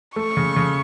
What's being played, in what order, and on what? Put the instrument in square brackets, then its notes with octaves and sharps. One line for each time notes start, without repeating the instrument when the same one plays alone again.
[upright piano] A3 [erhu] C#6
[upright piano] C#3
C#3